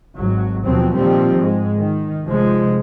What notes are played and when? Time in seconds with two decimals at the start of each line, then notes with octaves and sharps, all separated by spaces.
0.17 G#1 F#3
0.66 D#2 B2 F3 F#3 C4
0.96 A#2 D#3 F3 G3 C4
1.38 G#2 G#3
1.78 D#3
2.25 F1 F3 G#3